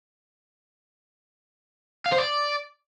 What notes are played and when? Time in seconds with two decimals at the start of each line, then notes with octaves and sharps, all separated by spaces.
2.06 F5
2.12 C5
2.18 D5